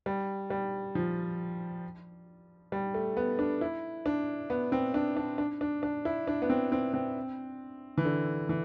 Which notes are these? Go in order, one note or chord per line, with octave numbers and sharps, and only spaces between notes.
G3
G3
F3
G3
A3
B3
D4
E4
D4
B3
C4
D4
D4
D4
D4
D4
E4
D4
B3
C4
C4
C4
E3
D3
E3